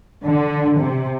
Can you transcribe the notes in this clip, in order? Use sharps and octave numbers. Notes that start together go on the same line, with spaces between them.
D3
C3